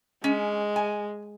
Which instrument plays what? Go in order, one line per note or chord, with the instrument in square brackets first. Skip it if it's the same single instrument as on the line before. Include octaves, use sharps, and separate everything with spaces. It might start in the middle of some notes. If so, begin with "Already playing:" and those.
[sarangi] G#3 [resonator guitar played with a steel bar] C#4
[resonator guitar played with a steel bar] G#5